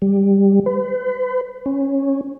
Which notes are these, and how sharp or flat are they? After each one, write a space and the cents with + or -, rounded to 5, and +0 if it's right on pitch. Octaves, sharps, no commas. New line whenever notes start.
G3 +10
B4 +40
C#4 -15